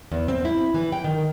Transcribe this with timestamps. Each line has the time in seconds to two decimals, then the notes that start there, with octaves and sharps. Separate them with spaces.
0.12 E2
0.28 C4
0.45 E4
0.74 E3
0.92 G5
1.04 D#3